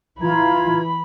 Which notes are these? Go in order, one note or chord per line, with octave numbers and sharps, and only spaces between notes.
E3 F4 A#5 B5 G#6